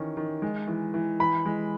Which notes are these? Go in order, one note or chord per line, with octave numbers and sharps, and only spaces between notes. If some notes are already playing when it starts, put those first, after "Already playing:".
Already playing: D#3 E3 C#4
D#3
G#3
E3
E3
E3 B5
G#3